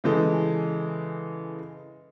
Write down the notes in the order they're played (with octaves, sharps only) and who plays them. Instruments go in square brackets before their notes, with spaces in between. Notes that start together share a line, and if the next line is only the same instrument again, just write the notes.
[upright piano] C#3 E3 G#3 A4